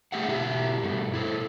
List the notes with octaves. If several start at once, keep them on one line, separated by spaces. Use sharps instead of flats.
A3 G4 G#4 E5 F#5
B2 E4 G4 E5
G2 B2 A3
E4 A4 C5